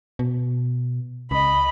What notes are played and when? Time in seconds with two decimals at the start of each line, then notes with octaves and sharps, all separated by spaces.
0.19 B2
1.31 C#2 D#5 B5